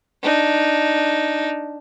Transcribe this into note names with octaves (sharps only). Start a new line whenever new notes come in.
D4 D#4